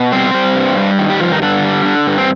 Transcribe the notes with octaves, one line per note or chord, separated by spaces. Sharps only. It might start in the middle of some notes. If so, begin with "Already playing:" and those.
Already playing: B2
G3 C4 C5
G3
G2
G3
D#3
G3 G4
G2 F3 F4
D#3 D#4
G2 D3 D4
G3
D3
G2
C4